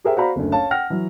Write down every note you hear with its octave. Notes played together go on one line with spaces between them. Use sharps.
G4 G#4 A#4 C5 E5 G5
F#4 C5 D5 F5 A#5 B5
F#1 D2
C#5 F5 A5
F#5 G5 F6 A#6
E3 F#3